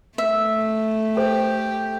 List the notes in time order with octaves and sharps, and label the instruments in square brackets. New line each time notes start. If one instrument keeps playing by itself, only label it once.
[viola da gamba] A3 [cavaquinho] E5
[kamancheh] G4 [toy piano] A4 C5